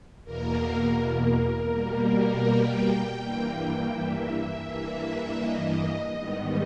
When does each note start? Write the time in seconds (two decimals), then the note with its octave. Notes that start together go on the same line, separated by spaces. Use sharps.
0.24 E2 B2 A#3 A#4
0.99 A#4
1.72 B2 G3 A#3
2.45 G5
3.19 G2 E3 A#3
3.93 E5
4.66 G2 E3 A#3
5.40 D#5
6.14 G#2 D#3 G3 B3